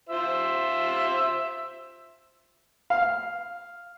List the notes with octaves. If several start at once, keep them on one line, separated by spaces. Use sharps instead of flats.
F4 C5 E5
F5